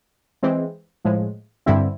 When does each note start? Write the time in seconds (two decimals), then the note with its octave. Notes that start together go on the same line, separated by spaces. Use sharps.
0.43 E3 G#3 C4
1.05 A2 F3 G#3
1.66 G2 D3 G3 C4 E4